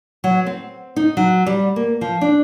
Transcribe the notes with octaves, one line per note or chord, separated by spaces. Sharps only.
F#3
C4
D#4
F#3
G3
A#3
F3
D4